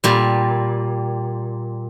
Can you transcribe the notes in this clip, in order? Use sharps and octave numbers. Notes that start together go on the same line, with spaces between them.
A#2 G3